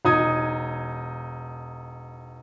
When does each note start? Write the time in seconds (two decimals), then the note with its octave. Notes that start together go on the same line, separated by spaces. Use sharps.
0.05 E1 D#4 D#6 G#6